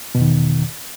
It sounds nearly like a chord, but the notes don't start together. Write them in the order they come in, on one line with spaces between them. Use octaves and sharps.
B2 E2 D#3